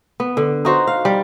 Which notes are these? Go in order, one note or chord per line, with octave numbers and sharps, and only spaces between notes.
B3
D3
D#4 F#4 C5
F5
G3